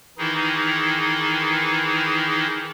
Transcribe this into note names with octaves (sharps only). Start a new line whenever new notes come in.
D#3 E3 D#4 E4 G#4